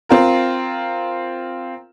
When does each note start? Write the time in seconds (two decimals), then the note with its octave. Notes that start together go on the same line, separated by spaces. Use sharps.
0.09 C4 F4 A#4